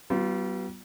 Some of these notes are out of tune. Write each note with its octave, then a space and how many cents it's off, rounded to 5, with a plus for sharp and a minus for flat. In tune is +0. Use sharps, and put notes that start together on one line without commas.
G3 -40 B3 +0 F4 +0